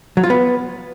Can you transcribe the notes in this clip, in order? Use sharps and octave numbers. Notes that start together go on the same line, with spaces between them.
F#3
F4
B3